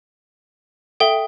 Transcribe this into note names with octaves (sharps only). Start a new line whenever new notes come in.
A4 E5 F5 G5 G7